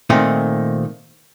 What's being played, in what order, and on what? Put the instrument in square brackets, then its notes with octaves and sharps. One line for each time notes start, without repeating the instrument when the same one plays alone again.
[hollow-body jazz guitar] A#2 D#3 A3 C4 D#4